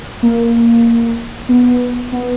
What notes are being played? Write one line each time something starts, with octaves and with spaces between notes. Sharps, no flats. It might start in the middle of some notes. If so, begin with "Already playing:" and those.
A#3
B3
B3